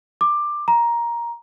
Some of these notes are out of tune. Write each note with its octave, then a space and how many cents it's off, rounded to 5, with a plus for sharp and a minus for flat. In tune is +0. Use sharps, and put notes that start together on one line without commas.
D6 +15
A#5 +10